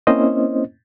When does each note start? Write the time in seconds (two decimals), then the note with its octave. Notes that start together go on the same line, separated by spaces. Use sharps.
0.07 A#3 C4 C#4 E4 C5 D#5